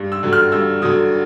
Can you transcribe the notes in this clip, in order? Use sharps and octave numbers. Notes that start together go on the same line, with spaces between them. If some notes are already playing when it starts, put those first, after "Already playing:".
Already playing: G2
E6
D3 F#3
F6
G2 E6
D3 F#3 D#6